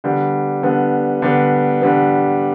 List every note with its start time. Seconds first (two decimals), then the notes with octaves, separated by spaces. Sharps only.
0.04 D3 G3 B3
0.63 D3 G3 B3
1.22 D3 G3 B3
1.81 D3 G3 B3